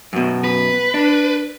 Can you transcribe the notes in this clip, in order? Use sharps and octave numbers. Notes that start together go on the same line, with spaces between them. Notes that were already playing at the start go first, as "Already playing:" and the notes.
F#2 B2
B4
D4